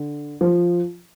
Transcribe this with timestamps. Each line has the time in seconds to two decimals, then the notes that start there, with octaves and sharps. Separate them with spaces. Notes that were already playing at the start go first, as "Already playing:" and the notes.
Already playing: D3
0.41 F3